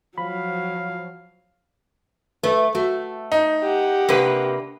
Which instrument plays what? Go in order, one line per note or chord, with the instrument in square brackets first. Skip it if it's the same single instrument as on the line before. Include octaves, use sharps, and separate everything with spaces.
[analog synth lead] F3 [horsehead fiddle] F#3 [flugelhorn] F5 [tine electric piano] B5
[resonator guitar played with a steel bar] A3 [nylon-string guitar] B4 E5
[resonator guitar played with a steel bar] A3 [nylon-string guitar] F#4
[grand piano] D#4
[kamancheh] G4 F#5
[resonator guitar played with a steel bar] C3 A#3 B4 [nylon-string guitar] D4